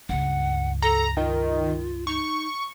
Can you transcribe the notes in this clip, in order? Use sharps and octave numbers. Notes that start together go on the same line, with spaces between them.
C#2 G2 F#5
A4 A#5
D#3 F4
D#4 C#6